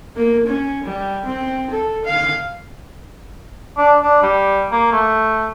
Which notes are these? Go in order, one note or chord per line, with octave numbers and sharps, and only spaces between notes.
A#3
C#4
G3
C4
A4
F5
D4
D4
G3
A#3
A3